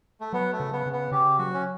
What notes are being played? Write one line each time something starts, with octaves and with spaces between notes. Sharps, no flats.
A3
F#3 B3
A3
C#3
B3
C#3
B3
C#3 G4
F#3 F#4
C#4